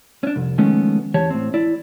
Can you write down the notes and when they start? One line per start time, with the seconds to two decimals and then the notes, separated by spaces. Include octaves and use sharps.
0.23 C#4 D4
0.36 C2 F2
0.58 D#3 F3 G#3 A3 B3 C#4
1.14 E2 E3 G4 C#5 A5
1.30 A2 C4
1.54 E4 D5